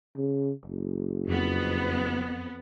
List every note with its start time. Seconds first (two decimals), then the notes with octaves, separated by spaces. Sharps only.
0.17 C#3
0.66 F#1
1.28 F2 B3